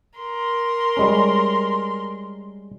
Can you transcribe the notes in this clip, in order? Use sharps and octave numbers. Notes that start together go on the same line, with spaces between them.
A#4 C6
G3 G#3 C#4